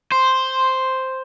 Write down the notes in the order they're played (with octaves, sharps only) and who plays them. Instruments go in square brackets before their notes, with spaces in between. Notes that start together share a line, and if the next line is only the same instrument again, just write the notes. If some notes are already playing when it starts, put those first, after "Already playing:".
[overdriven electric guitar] C5